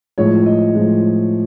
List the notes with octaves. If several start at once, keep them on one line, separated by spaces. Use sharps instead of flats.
A2 F3 G#3 C#5
D#5
A2 F3 G#3